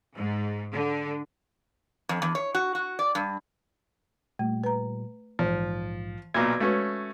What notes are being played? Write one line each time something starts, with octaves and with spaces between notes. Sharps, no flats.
G#2
D3
F2
E2
C#5
F#4
F#4
D5
G2
A#2 G3 A3
B4 A#5
A#1 G#2 E3 F3
B1 A#2 F#4 B4 G#6 A#6
G#3 A3 C#4 F#4 B4